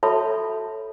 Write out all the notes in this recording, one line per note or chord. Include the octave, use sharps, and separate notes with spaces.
F#4 A4 C#5 E5 A5 B5